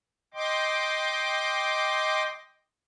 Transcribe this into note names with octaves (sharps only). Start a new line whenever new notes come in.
D#5 G5 C6 D6